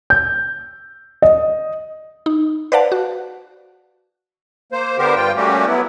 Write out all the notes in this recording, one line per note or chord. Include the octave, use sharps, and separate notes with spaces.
G6
D#5
D#4
B4 C5 D5 F5 F#5 A5
F#4
A#3 C5
D3 B3 G4 A#4 C5
G2 F4 G5
G3 A3 A#3 C#4 F#4 G4
F#3 B3 E4